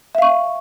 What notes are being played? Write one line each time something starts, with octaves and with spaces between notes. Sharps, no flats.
E5 F5 C#6